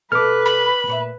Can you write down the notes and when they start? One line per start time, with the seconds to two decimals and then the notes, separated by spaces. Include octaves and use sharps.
0.12 B2 A4 B4 D#5 D6 F6
0.45 B5
0.87 A#2 C#5 E5